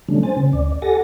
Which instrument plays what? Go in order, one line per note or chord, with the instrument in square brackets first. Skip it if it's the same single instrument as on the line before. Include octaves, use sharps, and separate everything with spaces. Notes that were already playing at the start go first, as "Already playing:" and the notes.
[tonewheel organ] D3 F#3 G3 A3 C#4 D4
C5 G#5 A6
C#3 C#4
D2 D5
G4 A4 F#5 G#5 A6 A#6